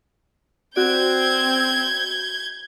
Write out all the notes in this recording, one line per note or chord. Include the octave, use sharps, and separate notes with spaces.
C4 F#4 D5 G6 G#6